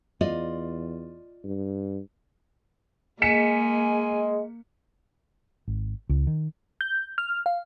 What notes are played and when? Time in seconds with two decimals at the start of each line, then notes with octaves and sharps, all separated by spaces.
0.21 E2 F4 D5 D#5
1.44 G2
3.22 G#3 A#3 G#5 B6 C#7 E7
5.68 G#1
6.09 C#2
6.27 D#3
6.81 G6
7.18 F6
7.46 F5